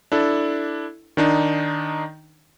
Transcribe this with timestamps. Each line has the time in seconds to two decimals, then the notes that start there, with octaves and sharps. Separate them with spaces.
0.12 D4 E4 A4
1.17 D#3 D4 D#4